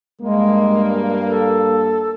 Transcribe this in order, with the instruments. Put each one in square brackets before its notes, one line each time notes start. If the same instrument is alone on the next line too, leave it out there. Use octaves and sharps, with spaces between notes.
[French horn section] G2 A#3 [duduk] G#3
[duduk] A4